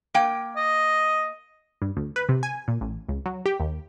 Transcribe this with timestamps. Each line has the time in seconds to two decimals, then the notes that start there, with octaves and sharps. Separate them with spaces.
0.14 A#3 G5
0.56 D#5
1.82 G2
1.97 D2
2.16 B4
2.29 C3
2.43 G#5
2.68 A#2
2.81 A1
3.09 C#2
3.26 F#3
3.46 G4
3.60 D#2